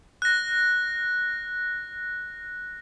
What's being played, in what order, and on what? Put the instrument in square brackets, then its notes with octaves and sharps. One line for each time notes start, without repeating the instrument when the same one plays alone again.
[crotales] F#6 A#6